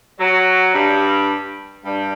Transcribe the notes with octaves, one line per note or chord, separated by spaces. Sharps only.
F#3
G2 G3
G2 G3